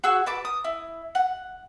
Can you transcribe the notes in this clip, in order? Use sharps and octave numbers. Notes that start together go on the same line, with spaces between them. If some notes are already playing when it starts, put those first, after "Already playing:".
F#4 G#4 E6
B4 A5 D6
D#6
E4
F#5